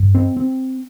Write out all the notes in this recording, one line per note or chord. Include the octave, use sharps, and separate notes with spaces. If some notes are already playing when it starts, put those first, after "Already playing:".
Already playing: G2
C4
C4